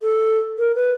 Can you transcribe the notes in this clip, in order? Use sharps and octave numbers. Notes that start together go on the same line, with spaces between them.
A4
A#4
B4